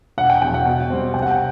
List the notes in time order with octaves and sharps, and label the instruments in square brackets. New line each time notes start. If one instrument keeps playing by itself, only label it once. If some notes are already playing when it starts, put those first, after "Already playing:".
[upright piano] E1 [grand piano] F#5
[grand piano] G5
[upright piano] E2 B2 F#3 [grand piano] G5
[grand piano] F#5
[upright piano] B2
G3 C4
[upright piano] C2 [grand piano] G5
[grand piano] F#5
G5